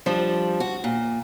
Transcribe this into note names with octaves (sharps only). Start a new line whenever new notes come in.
F3 G3 D4
F#4
A#2